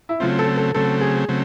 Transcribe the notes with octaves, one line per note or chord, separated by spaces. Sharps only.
E4
C#3 F#3 A3 C4 F4
A4
A4
C#3 F#3 A3 C4 A4
G#4
C#3 F#3 A3 C4